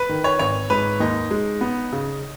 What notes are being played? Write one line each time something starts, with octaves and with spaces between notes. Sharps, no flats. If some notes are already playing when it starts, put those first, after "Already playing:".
Already playing: B4
D#3
C#5
G#1 C#5
G#2 B4
D#2 D#4
G#3
B3
C#3